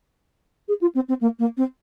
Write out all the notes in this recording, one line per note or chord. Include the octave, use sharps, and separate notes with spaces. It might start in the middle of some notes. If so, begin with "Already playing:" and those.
G#4
F4
C4
C4
A#3
A#3
C4